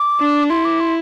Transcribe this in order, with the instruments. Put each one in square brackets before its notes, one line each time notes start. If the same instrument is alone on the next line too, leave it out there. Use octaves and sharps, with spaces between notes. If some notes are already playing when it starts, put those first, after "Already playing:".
Already playing: [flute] D6
[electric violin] D4
[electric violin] E4 [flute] C6
[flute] D6
C6